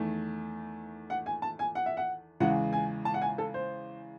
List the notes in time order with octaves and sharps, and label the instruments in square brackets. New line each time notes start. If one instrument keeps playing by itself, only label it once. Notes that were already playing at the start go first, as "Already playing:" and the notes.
Already playing: [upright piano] E2 D#3 A3
F#5
G#5
A5
G#5
F#5
E5
F#5
E2 C#3 E3 G#3 F#5
G#5
A5
F#5
G#5
A4
C5